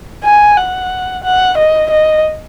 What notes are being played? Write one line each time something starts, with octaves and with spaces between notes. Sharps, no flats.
G#5
F#5
F#5
D#5
D#5